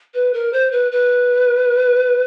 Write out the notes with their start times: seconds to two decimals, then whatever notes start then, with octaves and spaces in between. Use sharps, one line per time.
0.14 B4
0.34 A#4
0.53 C5
0.72 B4
0.92 B4